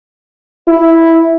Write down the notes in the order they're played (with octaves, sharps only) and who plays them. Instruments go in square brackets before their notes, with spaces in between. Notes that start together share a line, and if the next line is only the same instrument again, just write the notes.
[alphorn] E4